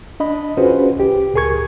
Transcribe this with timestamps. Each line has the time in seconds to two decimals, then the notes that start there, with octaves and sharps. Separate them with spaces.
0.20 D4 D#5 B5
0.57 C#4 F4 F#4 G#4 B4 C5
0.96 C2 G4
1.34 C#2 A2 G#4 A#4 C#6 G#6